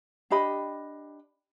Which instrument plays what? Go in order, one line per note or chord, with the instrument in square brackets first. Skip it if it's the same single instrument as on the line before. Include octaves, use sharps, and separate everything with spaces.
[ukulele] D4 G4 D#5 B5